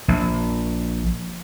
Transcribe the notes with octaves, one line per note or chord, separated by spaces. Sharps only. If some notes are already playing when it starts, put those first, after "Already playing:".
A#1